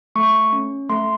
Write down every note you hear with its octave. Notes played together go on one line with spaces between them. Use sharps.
A3 C#6
C#4
A3 C6